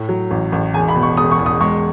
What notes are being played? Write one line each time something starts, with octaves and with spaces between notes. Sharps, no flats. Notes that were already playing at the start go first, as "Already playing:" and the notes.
Already playing: A2
F#3
A1
A1
E1 G#5
B5
B2
C#6
E1 D#6
C#6
E2
D#6
G#3 C#6